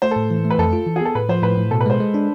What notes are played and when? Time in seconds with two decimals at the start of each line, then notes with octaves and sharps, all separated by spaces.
0.02 A3 C5
0.11 A4
0.16 A2
0.30 E3
0.45 A3
0.50 B4
0.58 F2 A4
0.73 F4
0.86 E3
0.96 G#4
1.01 B3 A4
1.15 A2 B4
1.29 F3 C5
1.43 A2 B4
1.57 A2
1.71 B2 A4
1.81 B4
1.86 G#3 C5
2.00 G#3
2.14 D4